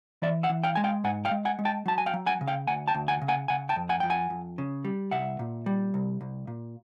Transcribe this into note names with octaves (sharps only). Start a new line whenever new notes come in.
E3 D5 E5
E5 F#5
E3
F5 G5
G#3 G#5
F5 G5
G#2 F#5 G#5
F5 G5
G#3
F#5 G#5
G#3
G5 A5
F#3 A5
G#5
F5 G5
F#3
F#5 G#5
C#3
F5 G5
D2 F#5 G#5
G5 A5
D2
F#5 G#5
C#3
F#5 G#5
C#3 F#5 G#5
G5 A5
F2
F#5 G#5
F2 G5
F#5 G#5
F2
C#3
G3
C2 E5 F#5
A#2
G3
C2
C2
A#2